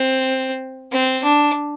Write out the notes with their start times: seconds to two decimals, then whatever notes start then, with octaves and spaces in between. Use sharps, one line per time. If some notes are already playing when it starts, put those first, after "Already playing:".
Already playing: C4
0.92 C4
1.23 D4